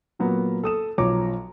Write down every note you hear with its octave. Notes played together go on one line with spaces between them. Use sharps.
A#2 F#3 A#3 B3
A4 D#6 E7
B1 F3 C#5 A#5 D6